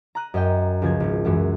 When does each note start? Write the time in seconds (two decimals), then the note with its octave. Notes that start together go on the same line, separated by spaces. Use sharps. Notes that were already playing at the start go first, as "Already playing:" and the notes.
0.15 A#5 F#6 D#7
0.34 F#2 D#5 G5
0.82 C#2 F3 G#6
1.00 G#1
1.25 F#2 E3 G#3 E4